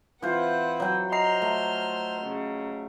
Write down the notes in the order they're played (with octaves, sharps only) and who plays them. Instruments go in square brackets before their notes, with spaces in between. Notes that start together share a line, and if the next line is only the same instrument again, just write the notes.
[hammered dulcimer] E3 F4 C5 [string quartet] C4 B4 F#5
[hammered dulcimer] F#3 G5
[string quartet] C5 C6 F6 [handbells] D#5 A#5 C7
[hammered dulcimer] A3
[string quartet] C#3